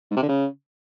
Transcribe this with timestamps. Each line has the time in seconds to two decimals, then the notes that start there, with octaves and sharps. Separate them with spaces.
0.11 G#2
0.17 C3
0.23 D3
0.29 C#3